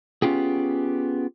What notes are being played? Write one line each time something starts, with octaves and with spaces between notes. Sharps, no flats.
B3 C#4 F4 G4 G#4